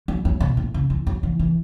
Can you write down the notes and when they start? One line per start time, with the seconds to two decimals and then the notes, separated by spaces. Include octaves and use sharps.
0.08 F#3
0.25 F#3
0.41 B2
0.57 A2
0.74 C#3
0.90 E3
1.07 F#3
1.23 E3
1.39 E3